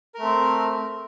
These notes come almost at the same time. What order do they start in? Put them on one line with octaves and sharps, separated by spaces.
A#4 A3 C4